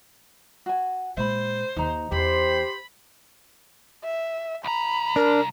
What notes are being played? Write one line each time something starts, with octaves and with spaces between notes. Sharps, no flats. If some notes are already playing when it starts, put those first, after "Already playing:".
F#4 G#5
A#2 G#3 C5 E5 B5
D#2 D#3 D#4 A#5
E2 G4 C5 B5
E5
C2 A#5 B5
D4 A#4